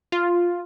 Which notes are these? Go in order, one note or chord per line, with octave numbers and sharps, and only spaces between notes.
F4